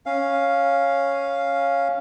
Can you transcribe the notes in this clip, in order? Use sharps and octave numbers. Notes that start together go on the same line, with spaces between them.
C#4 F5